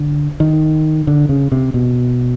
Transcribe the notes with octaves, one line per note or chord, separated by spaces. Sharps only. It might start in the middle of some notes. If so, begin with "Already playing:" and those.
Already playing: D3
D#3
D3
C#3
C3
B2